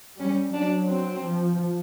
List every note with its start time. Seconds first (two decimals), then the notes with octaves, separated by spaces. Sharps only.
0.19 G3 C#4
0.54 F#3 D4
0.88 C4
1.23 F3